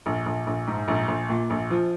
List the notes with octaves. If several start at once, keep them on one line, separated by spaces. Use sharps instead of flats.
A#1
A#1
A#1
G#2
A#1
A#1
A#2
A#1
F3